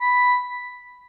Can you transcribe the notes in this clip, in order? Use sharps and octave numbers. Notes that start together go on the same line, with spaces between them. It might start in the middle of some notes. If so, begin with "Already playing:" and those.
B5